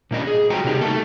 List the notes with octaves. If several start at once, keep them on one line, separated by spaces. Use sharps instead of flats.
A#2 A#3 D4 D#5
G#4
F3 G#3 F#4 D#5 G5 A#5
C3 A#3 D#4 G4
A3 A#3 A4